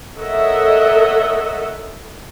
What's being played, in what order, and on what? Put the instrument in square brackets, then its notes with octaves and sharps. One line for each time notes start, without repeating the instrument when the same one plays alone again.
[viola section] A4 A#4 C#5 D#5 E5 F#5